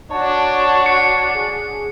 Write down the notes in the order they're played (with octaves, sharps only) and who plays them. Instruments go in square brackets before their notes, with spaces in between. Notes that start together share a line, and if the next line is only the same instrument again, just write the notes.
[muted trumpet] D4 [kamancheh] F#4 C#5 [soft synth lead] A5
[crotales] C#7
[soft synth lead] G#4